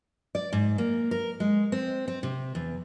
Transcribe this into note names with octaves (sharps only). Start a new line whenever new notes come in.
D5
G#2
A#3
A#4
G#3
C4
C4
C3
E2